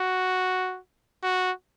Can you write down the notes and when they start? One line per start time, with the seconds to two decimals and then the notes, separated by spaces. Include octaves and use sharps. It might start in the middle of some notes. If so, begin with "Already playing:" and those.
Already playing: F#4
1.23 F#4